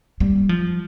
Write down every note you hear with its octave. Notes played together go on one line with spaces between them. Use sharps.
G3
F3